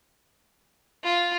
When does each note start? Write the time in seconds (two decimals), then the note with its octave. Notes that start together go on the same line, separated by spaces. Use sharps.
1.04 F4